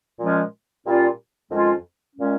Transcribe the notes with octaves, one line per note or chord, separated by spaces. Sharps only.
A#2 F3 G#3 C#4
A#2 G3 C#4 F4
F2 D#3 G#3 C#4 F4
A#2 G#3 C#4